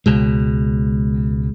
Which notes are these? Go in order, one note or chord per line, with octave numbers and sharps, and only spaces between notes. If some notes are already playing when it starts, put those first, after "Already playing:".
C#2 B2 G#3